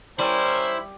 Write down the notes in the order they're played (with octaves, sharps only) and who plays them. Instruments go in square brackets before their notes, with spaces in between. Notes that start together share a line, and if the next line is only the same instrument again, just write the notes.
[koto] G3 D5 [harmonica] C#4 A#4 [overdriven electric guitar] E4 [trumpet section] C5